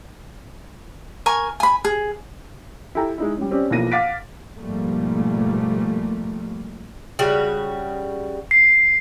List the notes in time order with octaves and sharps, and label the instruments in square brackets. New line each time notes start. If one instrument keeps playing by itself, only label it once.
[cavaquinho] A#4 G#5 C#6
G#5 B5
G#4
[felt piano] E4 G4 A4 G5 A#5
G#3 D#4 E4
G3 C#4
C4 C#4 G4 D5
B1 E3 F3 A#3 A#6 D#7
F5 F#5 D6 A6 B6 D7
[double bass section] G#2 B2 F3 G3 A3 A#3
[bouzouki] C#3 G3 F#4
[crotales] C7